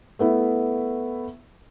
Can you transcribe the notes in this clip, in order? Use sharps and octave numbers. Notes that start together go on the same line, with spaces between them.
A3 B3 E4